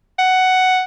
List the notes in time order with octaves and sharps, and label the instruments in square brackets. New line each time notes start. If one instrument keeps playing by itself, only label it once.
[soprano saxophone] F#5